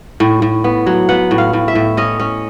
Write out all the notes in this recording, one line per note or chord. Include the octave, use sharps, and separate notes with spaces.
A2
A2
B3
F#3
B3 F#5
A2
F5
A2
E5
A2
C#4 D#5
C#4